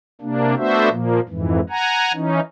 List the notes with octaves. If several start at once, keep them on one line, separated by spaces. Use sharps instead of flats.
C3 A#3 D4
A3 B3 D4 F#4 C5 E5
A#2 F3 A#3
F2 G#2 E3
F#5 G#5 A#5
E3 C#4 D#4